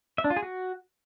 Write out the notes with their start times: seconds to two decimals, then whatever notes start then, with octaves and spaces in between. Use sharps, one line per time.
0.18 E5
0.24 D4
0.30 F4
0.36 G#4
0.43 F#4